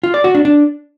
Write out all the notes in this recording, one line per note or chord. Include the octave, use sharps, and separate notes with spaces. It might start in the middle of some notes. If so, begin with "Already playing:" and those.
F4
D5
F#4
D4
D4